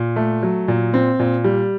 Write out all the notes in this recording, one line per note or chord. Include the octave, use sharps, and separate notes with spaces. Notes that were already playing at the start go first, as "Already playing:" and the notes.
Already playing: A#2
A3
F#3
A#2
C4
A#2
G3